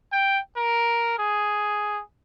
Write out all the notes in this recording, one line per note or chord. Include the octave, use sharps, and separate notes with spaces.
G5
A#4
G#4